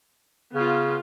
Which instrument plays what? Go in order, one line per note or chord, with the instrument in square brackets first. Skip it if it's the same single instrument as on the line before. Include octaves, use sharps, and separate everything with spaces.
[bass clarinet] C#3 [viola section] B3 F4